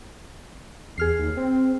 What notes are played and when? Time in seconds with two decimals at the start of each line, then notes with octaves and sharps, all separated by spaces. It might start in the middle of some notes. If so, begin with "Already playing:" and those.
0.98 E2 G#4 F6 C7
1.19 D#2
1.37 C4